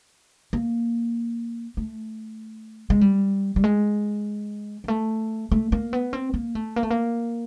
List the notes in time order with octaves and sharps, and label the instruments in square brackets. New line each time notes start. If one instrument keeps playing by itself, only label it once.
[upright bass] A#3
A3
G#3
G3
G3
G#3
G#3
A3
A3
A#3
B3
C4
A#3
A3
A#3
A3
A#3